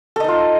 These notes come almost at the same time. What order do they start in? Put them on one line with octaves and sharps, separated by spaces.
A4 D#5 D#4 F4